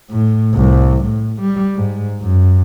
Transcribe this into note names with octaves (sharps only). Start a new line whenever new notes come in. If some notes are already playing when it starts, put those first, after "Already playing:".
A2
C2
A2
G3
G#2
F#2